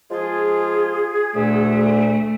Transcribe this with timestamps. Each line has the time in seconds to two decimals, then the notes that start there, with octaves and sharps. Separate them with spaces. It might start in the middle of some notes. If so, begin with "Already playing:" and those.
0.11 F3 G#3 F4 G#4
1.35 D2 A#2 A3